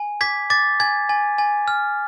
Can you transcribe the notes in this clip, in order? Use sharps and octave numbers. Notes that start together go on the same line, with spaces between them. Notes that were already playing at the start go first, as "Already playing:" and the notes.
Already playing: G#5
D6 G#6 B6
D6 A6
G#5 G#6
G#5
G#5
F6